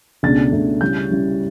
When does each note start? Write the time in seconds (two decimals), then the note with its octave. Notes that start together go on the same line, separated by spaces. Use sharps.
0.23 C#2 B2 A3 D4 A6
0.52 C#2 B2 A3 D4
0.81 C#3 G3 C#4 E4 G6
1.10 C#3 G3 C#4 E4